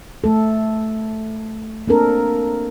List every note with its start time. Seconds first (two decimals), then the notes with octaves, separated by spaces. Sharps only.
0.24 A3 A4
1.88 A#3 C4 D4 A4 A#4